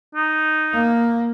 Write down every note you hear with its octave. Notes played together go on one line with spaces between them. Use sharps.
D#4
A#3